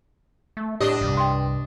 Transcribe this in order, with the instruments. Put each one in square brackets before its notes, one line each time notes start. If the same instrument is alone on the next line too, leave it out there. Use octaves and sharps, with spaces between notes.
[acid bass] A3
[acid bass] A2 [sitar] D4 D#5 [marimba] G4
[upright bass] C2 [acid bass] G2
[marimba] G5 C6